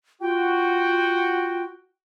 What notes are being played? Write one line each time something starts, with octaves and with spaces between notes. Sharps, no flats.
F4 F#4 G5